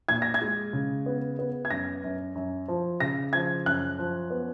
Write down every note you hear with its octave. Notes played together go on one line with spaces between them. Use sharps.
A#2 G#6
A#6
G#6
G#3
C#3
B3
B3
G#6
F#2 A#6
F#2
F#2
F3
C#3 A#6
F3 G#6
F#2 F#6
F3
B3